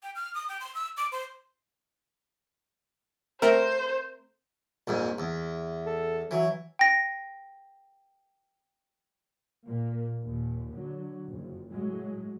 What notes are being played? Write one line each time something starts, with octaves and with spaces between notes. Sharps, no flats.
G5
F6
D#6
G5
C6
E6
D6
C5
A3 C4 A#4 C5
A#1 F2 G#2
E2
A4
E3 F#3
G5 A#6
A#2 A#3
D#2 A#2
D3 F#3
F#1 F2
A2 F#3 G#3